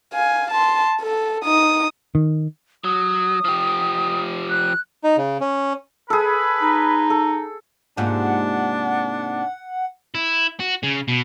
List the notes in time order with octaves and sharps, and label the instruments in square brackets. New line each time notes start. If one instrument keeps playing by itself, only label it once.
[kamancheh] F5 G#5
A5 C6
A4
D#4 D#6
[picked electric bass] D#3
[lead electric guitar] F#3 [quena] D#6
[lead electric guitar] F3 G4
[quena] F#6
[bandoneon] D#4
C#3
C#4
[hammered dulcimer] G#4 A4 [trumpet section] B4 B5
[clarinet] D#4
[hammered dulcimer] A4
[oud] G#2 C3 [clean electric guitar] A#3 F4 G#5 [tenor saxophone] D4 [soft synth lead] F#5
[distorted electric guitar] E4
F#4
C#3
B2